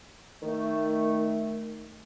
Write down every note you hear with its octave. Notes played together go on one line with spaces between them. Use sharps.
D#3 A3